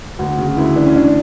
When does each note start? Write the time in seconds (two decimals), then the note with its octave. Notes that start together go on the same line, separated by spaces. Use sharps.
0.19 D2 F#4
0.38 C#3 F#4
0.57 D2 E4
0.76 E3 D4
0.86 C#4
0.95 D2 D4